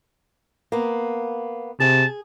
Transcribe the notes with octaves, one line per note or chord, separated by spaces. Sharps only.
A#3 B3
C3 G#4 A5